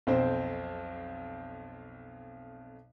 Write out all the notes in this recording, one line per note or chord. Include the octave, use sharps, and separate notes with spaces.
B1 F2 C4 C5